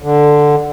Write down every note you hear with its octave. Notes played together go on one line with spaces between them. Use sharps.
D3